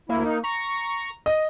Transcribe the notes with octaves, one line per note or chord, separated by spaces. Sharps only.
D2 A#3 E4
D#4
A#5 C#6
D#5